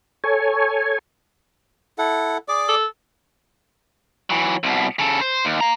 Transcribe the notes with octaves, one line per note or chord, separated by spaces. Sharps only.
A4 C#5 G#5
E4 A4 F#5
G#4 D5 D6
A4
E3 F#3
C2 B2
C#3 A4
C5
D#2
F5 A#5